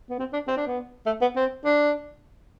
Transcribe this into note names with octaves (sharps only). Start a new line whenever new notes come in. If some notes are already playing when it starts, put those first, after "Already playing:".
B3
C4
D4
C4
D4
B3
A3
B3
C4
D4